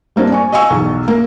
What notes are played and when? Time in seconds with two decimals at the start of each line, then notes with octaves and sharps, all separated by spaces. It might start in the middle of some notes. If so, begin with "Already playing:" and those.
0.16 G3 A#3 C4 D4
0.30 D5 G#5 C#6
0.52 D#5 F5 G#5 C#6 E6
0.70 B1 E2
1.08 A#3 A#4